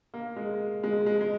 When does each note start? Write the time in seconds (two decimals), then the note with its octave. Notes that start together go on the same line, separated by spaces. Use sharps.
0.14 A#3
0.36 G#3
0.83 G#3
1.06 G#3
1.21 G#3